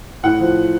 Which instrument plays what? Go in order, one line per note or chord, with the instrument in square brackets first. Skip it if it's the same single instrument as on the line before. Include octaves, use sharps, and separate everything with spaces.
[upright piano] A2 F#5
F3